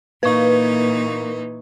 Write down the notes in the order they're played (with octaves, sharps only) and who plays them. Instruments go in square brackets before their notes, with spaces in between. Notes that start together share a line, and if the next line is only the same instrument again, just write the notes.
[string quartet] A#2 E3 D#4 [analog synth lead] A#3 [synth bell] B4 C#6